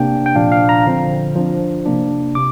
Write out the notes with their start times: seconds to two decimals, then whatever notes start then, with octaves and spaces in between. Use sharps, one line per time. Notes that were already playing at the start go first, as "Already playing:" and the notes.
Already playing: C3 A#3 D4 G5
0.26 G5
0.35 A#2 F3 D4 F5
0.52 F5
0.69 A#5
0.86 D3 F3 C4
1.36 F3 D4
1.86 C3 A#3 D4
2.35 C3 D6